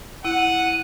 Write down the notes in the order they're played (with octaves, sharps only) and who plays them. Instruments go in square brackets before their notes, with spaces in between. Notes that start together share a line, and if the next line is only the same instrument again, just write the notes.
[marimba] E4 [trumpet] F#5 [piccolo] D#7